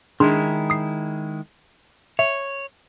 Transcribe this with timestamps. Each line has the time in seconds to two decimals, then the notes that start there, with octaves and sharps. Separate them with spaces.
0.20 D#3 G#3 D4 E4 G#4 C6
0.70 D#6 C7
2.19 C#5 E5